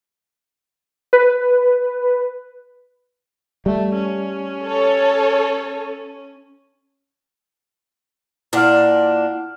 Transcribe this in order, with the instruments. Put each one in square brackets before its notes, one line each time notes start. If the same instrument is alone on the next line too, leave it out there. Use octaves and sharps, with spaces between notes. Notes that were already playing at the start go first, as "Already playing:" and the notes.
[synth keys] B4
[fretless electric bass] G3 [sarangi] A3
[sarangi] C#4
[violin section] A4 C#5
[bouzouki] A#2 A#3 D4 [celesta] E4 F#5 F6